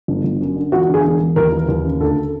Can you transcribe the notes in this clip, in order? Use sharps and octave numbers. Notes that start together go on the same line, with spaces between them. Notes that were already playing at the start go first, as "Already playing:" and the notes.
G1
G1
F#2
D3
E1 F#4
D3
G#4
E1
E1
D#2 A#4
E3
D#2
C#3
D2 A4